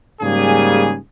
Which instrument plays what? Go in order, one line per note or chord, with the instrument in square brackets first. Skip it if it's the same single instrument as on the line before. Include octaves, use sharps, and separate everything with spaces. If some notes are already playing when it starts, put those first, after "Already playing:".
[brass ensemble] G#2 C#3 G3 A#3 G#4 G#5